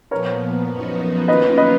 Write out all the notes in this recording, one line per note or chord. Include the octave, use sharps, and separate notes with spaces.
A#2 F3 B3 A#4 C#5
F#2 F3 B3 D#4 F#4
F#2 D#3 A#3 C#4 F4 B4 D#5
B4 D#5